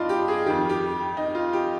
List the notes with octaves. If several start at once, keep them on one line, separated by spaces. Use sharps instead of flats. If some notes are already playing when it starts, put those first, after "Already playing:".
Already playing: G2 D4 D#4 F4
G4
G#4
F2 D#3 G4
G4
D#4
F4
G4